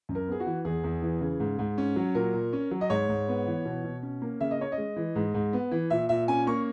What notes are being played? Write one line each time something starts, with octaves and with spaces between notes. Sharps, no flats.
F#2
A#4
B3 G#4
F#4
E3
E2 G#4
E2
E3
C#3
G#2
G#2
C#4
F#3
A#2 A#4
A#2
C#4
F#3
D#5
G#2 C#5
G#2
B3
E3
B2
B2
C#4
A#3
C#3 E5
D#5
C#4 C#5
D#5
G#3
E3
G#2
G#2
B3
E3
A#2 E5
A#2 E5
C#4 G#5
A#3 C#6